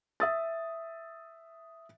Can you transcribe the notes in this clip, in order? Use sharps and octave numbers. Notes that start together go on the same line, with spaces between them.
E5 D#6 A6